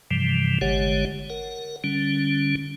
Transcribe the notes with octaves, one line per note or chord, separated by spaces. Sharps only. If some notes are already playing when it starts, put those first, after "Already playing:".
G2 C3 E3 F3 G3
G#1 D3 G#3 G4 C#5 F#5
A#4 F#5
D3 G3 C#4